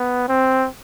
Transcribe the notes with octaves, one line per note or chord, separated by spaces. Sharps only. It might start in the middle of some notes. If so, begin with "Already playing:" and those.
Already playing: B3
C4